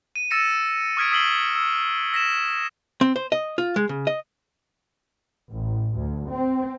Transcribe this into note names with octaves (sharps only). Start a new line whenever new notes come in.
D#7
E6 A6 A#6 C#7 E7
C#6 D#6 F6 G#6 B6 D7
D#6 E6 B6 C7 F#7 G7
E6
E6 A#6 B6 E7
C4
C5
D#5
F4
G#3
C#3
D#5
A1
D2
C4